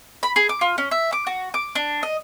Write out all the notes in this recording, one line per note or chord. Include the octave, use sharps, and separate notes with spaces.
B5
G#4
D6
F4
C#4
E5
D6
F#4
D6
D4
D#5